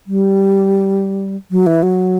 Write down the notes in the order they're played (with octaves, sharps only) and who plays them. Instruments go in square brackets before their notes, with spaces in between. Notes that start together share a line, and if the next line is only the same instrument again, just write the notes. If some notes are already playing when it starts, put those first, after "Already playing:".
[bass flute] G3
F#3
E3
F#3